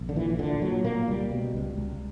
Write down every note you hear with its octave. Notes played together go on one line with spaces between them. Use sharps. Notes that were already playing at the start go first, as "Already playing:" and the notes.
Already playing: A#1
D3
A#2 E3
E3
A#2 D3
A#2 F#3
A#2 A#3
C#2 G3
B2
C#2
C#2